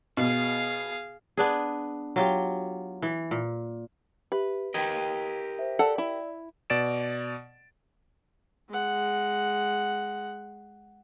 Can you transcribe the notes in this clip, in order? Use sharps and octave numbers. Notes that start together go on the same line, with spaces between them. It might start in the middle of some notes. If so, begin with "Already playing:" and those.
B2 G#4 F5
B3 D4 G#4
F#3 F4 G4
E3
A#2
G4 B4 E5
G4 A#4 D#5 G5 G#6
C5 E5
A4 D5 F#5 E6
E4
B2 D5 A6 D7 E7
G#3 F#5